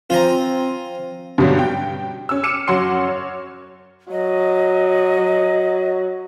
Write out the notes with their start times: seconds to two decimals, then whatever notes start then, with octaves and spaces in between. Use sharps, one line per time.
0.10 F3 C4 F4 C5 G#5 A#5
1.38 G2 B2 D3 F#3 G3 C#4
1.59 G5
2.29 C#4 E6
2.43 D6 F6 C#7 D#7 E7
2.67 F#2 F#3 C#5 F#5 C6 C#7
3.08 C#5
4.11 F#3 D#5